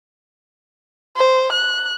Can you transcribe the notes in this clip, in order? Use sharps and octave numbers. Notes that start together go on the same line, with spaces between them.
C5
F#6